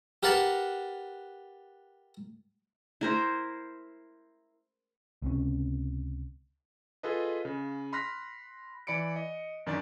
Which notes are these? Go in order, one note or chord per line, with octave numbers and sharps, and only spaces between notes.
G4 A#4 B4 F#5 A5 A#5
E4 A#4 C5
C#2 C3 C#4
F4 G#4 A4 B4 D#5
C#3
B5 C6 F6 F#6 A#6 B6
E3 D5 B5 C#7 D7
D#5
F#2 D#3 D4 D5 A6